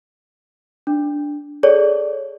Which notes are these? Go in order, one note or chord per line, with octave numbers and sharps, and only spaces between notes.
D4
G#4 A4 C#5 D5